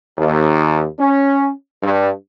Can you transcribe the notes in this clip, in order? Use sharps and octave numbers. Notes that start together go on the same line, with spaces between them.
D#2
C#4
G2